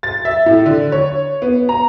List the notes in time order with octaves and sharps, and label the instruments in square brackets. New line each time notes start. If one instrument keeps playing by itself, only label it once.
[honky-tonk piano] A6
E5
A2
D3
C#5
B3
A#5